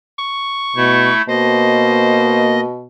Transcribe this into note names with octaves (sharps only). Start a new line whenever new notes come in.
C#6
B2 A3 E4
B2 A#3 C5 D#5